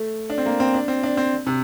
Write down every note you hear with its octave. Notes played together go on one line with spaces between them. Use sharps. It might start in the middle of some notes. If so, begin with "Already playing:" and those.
Already playing: A3
D4
C4
A#3
C4
D4
C4
D4
C4
C3